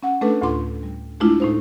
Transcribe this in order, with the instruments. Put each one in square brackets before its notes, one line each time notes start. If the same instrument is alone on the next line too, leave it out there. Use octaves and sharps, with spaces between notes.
[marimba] C#4 F#5
A3 C#4 D4 A4 B4
D2 A2 F4 C6 D6
G3
G#3 A3 D4 E4 F4
A2 D#4 C5